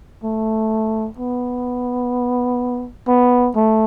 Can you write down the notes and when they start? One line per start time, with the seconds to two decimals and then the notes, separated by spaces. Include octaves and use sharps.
0.24 A3
1.18 B3
3.07 B3
3.55 A3